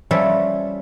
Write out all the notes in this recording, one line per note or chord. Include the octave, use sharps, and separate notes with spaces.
F3 G3 C#4 A4 C#5 E5